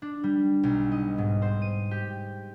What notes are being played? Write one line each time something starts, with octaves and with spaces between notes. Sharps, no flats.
D4
G3
B1
D#5
G#2
C5
D#7
G4